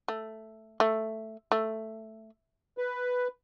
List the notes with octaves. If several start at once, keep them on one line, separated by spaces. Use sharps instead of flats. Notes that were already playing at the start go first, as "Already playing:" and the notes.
A3
A3
A3
B4